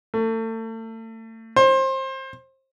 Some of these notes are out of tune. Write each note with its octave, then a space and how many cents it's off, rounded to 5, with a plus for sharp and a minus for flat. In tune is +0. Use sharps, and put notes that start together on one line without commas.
A3 +35
C5 +25